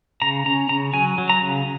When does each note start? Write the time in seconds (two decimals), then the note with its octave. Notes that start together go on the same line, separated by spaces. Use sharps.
0.22 C#3 A#5
0.46 C#4 A#5
0.69 C#3 A#5
0.93 F#3 G#5
1.18 F#3
1.29 A#5
1.42 C#3